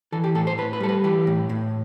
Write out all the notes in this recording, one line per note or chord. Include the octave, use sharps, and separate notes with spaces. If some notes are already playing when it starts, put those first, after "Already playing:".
E3 A4
G4
A2 A4
C5
A2 B4
B4
G3 A4
B4
E3 G4
A2
A2